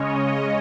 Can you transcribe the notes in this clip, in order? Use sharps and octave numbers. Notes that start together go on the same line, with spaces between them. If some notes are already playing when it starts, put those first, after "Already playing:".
Already playing: C#3 G#3 C#4 C#5 D#5